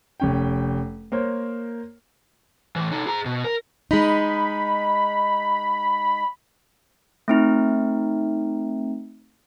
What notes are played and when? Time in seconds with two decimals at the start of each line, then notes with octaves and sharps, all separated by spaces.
0.20 F1 C#4 G5
1.12 A#3 A#4 C5 C#5
2.76 A2 E3
2.92 D#4 A4
3.07 G#4 A#5
3.25 B2
3.44 A#4
3.91 G#3 D#4 B5
7.28 A3 C4 D#4